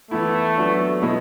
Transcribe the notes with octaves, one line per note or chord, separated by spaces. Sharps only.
E3 A3 B3 E4
F#3 B3 D4
B2 G#3 B3 E4